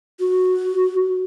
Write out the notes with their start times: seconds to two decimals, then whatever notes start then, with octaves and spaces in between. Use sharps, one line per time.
0.20 F#4